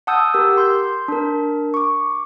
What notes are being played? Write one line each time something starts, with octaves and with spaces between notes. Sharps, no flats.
F#5 A5 D#6 E6 G6
G4 A#4 E6
C6 G6
D4 A#4
C#6 D6